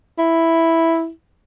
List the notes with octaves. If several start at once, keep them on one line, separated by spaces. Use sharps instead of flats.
E4